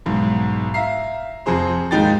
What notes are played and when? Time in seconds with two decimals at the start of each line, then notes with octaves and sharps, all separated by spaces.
0.06 B1 G#2
0.74 E5 F5 A#5 C7
1.46 F2 C3 C4 G#4 C5 A#5
1.91 D#2 G#2 G#3 D#4 G5 A6